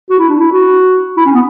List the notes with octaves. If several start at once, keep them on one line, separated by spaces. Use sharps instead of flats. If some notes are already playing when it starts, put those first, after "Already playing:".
F#4
E4
D4
E4
F#4
E4
C#4
B3